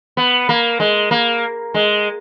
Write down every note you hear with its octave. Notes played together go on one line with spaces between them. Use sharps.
B3
A#3
G#3
A#3
G#3